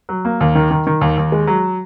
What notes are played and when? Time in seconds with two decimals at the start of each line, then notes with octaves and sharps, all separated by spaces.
0.09 F#3
0.25 A#3
0.40 D#2
0.55 D#3
0.71 D#3
0.87 D#3
1.01 D#2
1.17 D#2
1.32 G#3
1.47 F#3